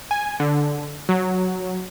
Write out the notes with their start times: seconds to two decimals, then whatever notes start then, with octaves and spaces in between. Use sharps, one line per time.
0.11 G#5
0.40 D3
1.09 F#3